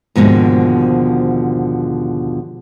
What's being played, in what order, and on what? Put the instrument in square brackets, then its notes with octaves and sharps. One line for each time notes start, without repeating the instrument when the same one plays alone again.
[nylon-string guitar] D#2 G#2 B2 D3 F3